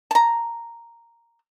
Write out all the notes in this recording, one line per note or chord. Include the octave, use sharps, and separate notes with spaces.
A5 A#5